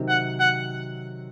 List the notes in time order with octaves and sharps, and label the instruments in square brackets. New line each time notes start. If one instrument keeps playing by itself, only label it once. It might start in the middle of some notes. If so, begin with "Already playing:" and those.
Already playing: [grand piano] C3 D#3 F#3 C4 D#4
[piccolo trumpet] F#5
F#5